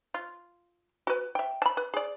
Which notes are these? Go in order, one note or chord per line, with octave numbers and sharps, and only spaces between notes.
F4
F#4 B4
E5 G5
A5 B5
B4
G#4 D5